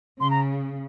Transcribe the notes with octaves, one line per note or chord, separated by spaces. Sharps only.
C#3 C6
A#5